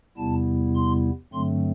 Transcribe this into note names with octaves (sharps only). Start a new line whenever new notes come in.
E2 C3 G3 B3 E4 A5
C6
G2 D3 F#3 A3 C4 C6